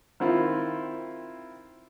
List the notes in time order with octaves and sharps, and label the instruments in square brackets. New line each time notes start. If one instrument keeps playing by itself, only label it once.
[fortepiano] D#3 C4 E4 F4